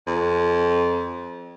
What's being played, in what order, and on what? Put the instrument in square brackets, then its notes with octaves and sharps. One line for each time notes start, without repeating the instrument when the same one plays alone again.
[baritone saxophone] F2